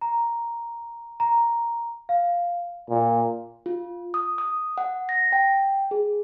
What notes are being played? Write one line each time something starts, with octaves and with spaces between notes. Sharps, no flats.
A#5
A#5
F5
A#2
F4
D#6
D#6
F#5
A#6
G5
G#4